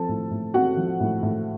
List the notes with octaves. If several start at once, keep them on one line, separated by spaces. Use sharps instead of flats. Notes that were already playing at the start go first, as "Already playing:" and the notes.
Already playing: F3 C4 A4 A5
A2
A2
C4 F#4 F#5
F3
A2
A2